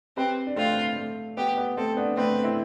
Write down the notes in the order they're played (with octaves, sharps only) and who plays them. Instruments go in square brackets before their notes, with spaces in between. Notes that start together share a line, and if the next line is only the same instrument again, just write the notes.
[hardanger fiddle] C4 [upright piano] G4 B4
[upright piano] D4
[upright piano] A3 C4 [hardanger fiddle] F4
[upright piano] A3
[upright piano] B3 [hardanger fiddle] G4
[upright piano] B3
[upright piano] A3 C4 [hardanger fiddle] A4
[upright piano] B3 D4
[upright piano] A3 C4 [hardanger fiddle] B4
[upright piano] C4 E4